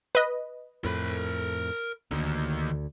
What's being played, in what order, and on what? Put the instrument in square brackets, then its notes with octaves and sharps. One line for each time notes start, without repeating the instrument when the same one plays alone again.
[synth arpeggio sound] B4 D#5
[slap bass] F2 A2 [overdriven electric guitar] A#4 B5
[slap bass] D2 D3 [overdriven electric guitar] D#3 A#3